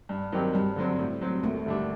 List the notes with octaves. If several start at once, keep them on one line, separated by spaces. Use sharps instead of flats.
G2
D#3 F#3 C4 G4
G2 G3
D3 F#3 C4
A2
F#3 C4
D#2 A3
D3 G3 D4